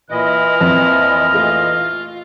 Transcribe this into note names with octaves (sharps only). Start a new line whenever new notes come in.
A#2 E3 E4 D#5 F6
F2
A3 F4